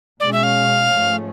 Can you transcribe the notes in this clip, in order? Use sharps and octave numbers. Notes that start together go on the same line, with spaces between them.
B2 G#3 C#4 D5
E5
F5
G#2 F3 A3 C#4